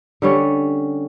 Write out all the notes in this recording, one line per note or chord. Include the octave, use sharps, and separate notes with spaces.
D3 G3 C#4